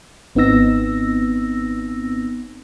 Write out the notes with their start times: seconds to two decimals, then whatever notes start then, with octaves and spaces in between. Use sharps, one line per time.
0.35 G#1 B3 C4 D#4 E6 A#6